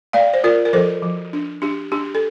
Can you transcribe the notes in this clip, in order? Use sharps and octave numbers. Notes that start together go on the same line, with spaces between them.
A3 D5 F5
C5
F4 A#4 D5
A#4
F3 A4 C5
F3
D4
D4 G4
D4 G4
A4